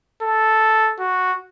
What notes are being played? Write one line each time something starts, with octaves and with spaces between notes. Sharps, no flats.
A4
F#4